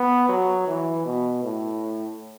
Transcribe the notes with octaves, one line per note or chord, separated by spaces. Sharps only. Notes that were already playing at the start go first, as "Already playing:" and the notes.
Already playing: B3
F#3
E3
B2
A2